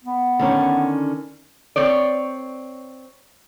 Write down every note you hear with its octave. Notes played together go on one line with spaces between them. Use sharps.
B3
D3 D#3 C#4
C4 C#5 D5